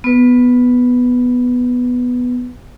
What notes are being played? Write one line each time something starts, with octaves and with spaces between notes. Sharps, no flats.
B3 B4